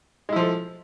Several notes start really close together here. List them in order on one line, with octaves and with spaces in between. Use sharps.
G#3 E4 F3 A4